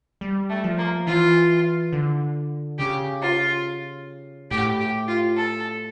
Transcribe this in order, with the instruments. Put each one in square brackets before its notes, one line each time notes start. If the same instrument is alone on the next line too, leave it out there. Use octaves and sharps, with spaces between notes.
[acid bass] G3
[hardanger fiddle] A3
[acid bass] F3
[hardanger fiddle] A#3
[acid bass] E3 [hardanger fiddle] F4
[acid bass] D3
[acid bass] C#3 [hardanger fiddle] G4
[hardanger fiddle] F4
[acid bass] A2 [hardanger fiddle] G4
[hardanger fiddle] G4
F4
A4